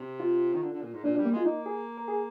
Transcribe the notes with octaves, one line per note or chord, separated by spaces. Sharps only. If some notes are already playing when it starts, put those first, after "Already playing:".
Already playing: C3
F4
D#3
D3
D3
A#2
G#2
A#2 D4
D4
G3
A#3
G#3 F4
A#3 D#4
G#4
A#4
G#4